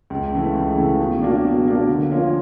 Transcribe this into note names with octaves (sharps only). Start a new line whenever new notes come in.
C#2
C#3 E3 A3
C#2
C#3 E3 A3
B2
F#3 A#3 D4
B2
F#3 A#3 D4
D3
F3 A#3 C#4 F4